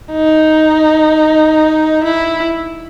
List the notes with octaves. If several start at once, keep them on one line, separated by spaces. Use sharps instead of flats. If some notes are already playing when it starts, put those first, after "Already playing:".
D#4
E4